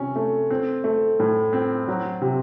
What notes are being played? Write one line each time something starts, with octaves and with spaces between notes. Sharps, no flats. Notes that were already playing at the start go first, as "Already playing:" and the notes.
Already playing: C3 C#4
A3
C4
A3
A2
C4
F#3
C3